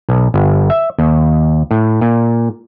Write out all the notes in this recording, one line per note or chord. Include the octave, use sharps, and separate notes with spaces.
B1
G1
E5
D#2
A2
A#2